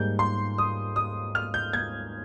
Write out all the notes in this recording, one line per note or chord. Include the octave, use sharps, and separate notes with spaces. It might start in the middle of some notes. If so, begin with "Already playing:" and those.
Already playing: G#2 G3 A#3 G6
C6
D#6
D#6
F6
G6
G#6